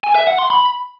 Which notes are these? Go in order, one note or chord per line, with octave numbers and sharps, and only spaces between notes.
G#5
E5
F#5
C6
B5